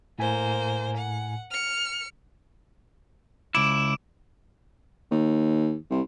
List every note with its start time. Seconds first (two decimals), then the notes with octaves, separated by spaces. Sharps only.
0.19 A2 A#3 C5 G#5
0.98 F#5
1.51 F6 C#7
3.55 C#2 E4 D6 D7 E7
5.11 D#2
5.90 C2